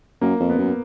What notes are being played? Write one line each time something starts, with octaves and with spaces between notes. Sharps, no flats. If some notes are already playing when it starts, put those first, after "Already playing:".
F#2 A#3
F2
B3
F#2